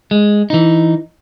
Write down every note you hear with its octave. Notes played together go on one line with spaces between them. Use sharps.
G#3
E3 D#4